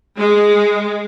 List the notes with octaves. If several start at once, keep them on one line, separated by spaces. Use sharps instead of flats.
G#3